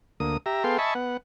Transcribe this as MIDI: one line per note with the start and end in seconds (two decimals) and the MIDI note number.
0.20 0.37 38
0.20 0.37 58
0.20 0.37 87
0.46 0.63 67
0.46 0.63 76
0.46 0.63 82
0.64 0.78 59
0.64 0.78 68
0.64 0.78 69
0.64 0.78 77
0.64 0.78 79
0.64 0.78 84
0.78 0.94 75
0.78 0.94 76
0.78 0.94 80
0.78 0.94 81
0.78 0.94 83
0.78 0.94 85
0.95 1.17 59
0.95 1.17 78